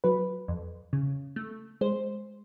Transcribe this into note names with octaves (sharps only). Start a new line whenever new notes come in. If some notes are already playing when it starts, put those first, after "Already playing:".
F#3 B4
F2
C#3
A3
G#3 C5